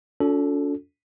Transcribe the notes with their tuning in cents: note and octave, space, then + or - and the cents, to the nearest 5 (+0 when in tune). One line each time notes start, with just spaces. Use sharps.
D4 -45 F4 +40 A4 +0